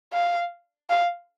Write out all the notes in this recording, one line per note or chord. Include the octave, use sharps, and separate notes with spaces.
F5
F5